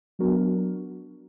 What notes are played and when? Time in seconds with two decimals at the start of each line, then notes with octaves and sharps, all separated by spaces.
0.19 F#3 B3 D4 F#4 A#4